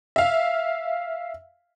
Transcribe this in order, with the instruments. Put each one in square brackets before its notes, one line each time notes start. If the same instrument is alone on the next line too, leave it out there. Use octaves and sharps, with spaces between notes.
[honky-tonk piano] E5 F5